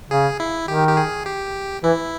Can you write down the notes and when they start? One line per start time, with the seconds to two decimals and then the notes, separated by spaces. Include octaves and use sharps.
0.10 C#3 G#4
0.40 E4
0.68 D#3 G4
0.88 G4
0.97 G#4
1.26 G4
1.83 E3 E4